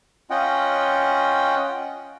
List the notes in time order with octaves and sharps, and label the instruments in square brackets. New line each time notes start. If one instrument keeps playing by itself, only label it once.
[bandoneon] C#4 F4 D#5 F#5 G5